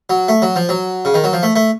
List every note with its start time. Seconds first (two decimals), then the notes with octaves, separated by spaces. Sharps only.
0.10 F#3
0.28 A3
0.42 F#3
0.56 F3
0.69 F#3
1.05 C#3
1.14 D#3
1.24 F#3
1.33 F3
1.43 A3
1.56 A3